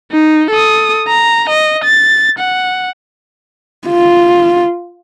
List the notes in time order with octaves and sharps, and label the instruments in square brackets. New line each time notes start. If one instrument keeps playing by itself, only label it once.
[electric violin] D#4
A4 D#6
A#5
D#5
A6
F#5
[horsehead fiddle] F4